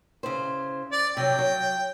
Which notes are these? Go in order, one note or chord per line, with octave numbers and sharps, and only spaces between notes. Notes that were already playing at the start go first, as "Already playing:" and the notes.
C#3 E4 C5
D5
C3 F#3 G5
F#3